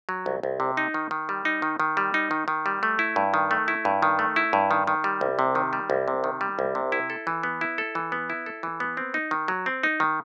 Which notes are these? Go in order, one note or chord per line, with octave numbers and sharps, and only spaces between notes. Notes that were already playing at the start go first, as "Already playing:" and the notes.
F#3
C2
C2
C3
D#4
D#3
D#3
G3
D#4
D#3
D#3
G3
D#4
D#3
D#3
G3
A3
E4
G2
D#3
A3
E4
G2
D#3
A3
E4
G2
D#3
D#3
G3
C2
C3
D#3
G3
C2
C3
D#3
G3
C2
C3
E4
A4
E3
B3
E4
A4
E3
B3
E4
A4
E3
B3
C4
D#4
D#3
F#3
C4
D#4
D#3